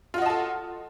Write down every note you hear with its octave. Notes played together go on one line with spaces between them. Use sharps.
F4 F#4 A4 D#5 A5